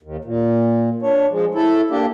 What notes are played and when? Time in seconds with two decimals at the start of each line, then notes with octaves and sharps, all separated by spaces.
0.03 D#2
0.25 A#2
1.02 D4 C#5
1.30 F3 G#3
1.55 E4 A4
1.91 A#3 D4 G4